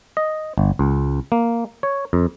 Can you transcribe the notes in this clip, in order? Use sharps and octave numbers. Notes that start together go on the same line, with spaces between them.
D#5
G1
C#2
A#3
C#5
F2